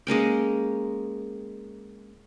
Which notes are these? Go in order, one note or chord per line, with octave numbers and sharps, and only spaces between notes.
G#3 A#3 C#4 G5